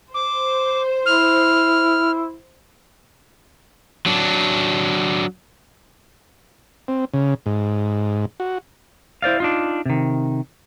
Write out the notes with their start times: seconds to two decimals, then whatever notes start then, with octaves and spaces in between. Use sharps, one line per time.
0.14 C5 D6
1.06 E4 F6
4.06 F#3 D4
6.88 C4
7.14 C#3
7.46 G#2
8.40 F#4
9.22 E4 C5 D5 F5
9.40 D4 D#4 F4
9.86 C3 D#3